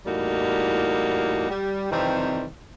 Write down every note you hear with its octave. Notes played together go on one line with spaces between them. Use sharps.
E2 A2 G3 A#3 D#4 F#4
G3
F2 C3 D#3 E3 G3 C5